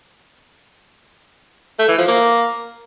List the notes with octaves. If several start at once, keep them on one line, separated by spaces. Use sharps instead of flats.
A3
E3
F3
A#3